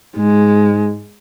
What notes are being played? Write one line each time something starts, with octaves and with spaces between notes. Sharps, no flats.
G#2 G#3